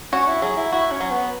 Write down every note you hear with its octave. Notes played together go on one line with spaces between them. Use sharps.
C#4 F#4
E4
F#3 G#4
E4
E4 F#4
C#4
F#3
B3